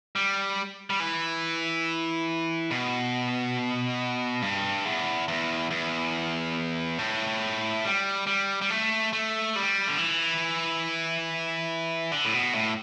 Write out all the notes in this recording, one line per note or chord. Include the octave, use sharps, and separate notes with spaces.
G3
G3
E3
B2
G2
E2
E2
E2
A2
G3
G3
G3
A3
A3
G3
D3
E3
D3
A2
B2
A2